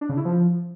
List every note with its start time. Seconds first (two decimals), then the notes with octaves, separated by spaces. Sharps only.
0.01 D4
0.09 C#3
0.17 E4
0.25 F3